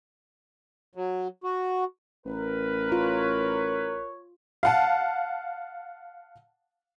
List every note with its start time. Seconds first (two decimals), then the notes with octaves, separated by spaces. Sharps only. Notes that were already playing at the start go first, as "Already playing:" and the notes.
0.95 F#3
1.44 F#4
2.26 A1 A#4 B4
2.92 F4 C#5
4.63 F5 F#5 A5